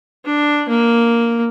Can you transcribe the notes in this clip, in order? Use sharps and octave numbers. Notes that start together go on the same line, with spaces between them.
D4
A#3